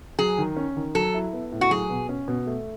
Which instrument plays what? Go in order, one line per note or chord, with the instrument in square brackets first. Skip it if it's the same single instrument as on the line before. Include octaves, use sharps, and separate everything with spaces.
[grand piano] F#3 [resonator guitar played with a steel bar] G#4
[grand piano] D#3
C#4
D#3
[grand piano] F#3 [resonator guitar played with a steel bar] A4
[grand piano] E4
B3
A2
[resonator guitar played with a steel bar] F#4
[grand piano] F#3 [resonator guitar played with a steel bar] G#4
[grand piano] B2
C#4
B2
A3